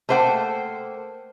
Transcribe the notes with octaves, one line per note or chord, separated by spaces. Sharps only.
A3 A#3 C5 F#5 G5